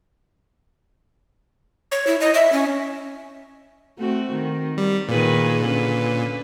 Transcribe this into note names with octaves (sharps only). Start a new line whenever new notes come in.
C#5
E4
D#5
E5
C#4
A3 C4 F#4
D#3
G3
A#2 D#3 G#4 B4
D3 C#4 B4